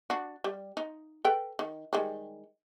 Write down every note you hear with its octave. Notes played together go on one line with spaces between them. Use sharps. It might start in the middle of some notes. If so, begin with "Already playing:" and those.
D4 F#4
G3
D#4
A4 B4 G5
D#3
D#3 G3 G#3